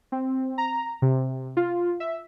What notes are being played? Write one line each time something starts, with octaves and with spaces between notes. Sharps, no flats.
C4
A#5
C3
F4
E5